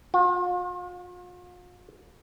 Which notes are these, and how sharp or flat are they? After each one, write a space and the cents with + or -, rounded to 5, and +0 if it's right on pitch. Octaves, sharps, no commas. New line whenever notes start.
F4 +45